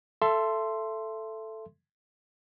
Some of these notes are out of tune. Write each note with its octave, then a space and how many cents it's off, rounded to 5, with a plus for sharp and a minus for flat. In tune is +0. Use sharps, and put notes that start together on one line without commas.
A4 +0 E5 +25 C6 +0